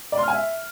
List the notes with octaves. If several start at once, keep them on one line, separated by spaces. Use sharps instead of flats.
D5
C6
F6
G#5
E5